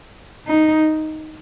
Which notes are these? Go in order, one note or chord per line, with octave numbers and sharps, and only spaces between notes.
D#4